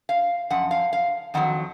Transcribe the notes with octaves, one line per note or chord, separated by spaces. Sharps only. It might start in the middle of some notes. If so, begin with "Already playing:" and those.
F5
F#2 F3 F#5
F5
F5
F2 D#3 F#3 F#5